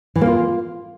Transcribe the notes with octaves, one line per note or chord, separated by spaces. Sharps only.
E3
A#3
F4